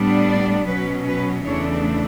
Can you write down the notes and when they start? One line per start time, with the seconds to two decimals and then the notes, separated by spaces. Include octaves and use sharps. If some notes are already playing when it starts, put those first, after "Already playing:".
Already playing: A2 G3 B3 D4
0.28 D5
0.67 B2 F#3 C#4 B4
1.07 B4
1.45 E2 C#3 E3 A3 D4 C#5